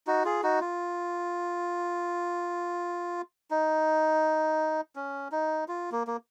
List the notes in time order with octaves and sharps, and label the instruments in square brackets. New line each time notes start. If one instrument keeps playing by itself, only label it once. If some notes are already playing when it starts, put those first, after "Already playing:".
[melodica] D#4 F#4
F4 G#4
D#4 F#4
F4
D#4
C#4
D#4
F4
A#3
A#3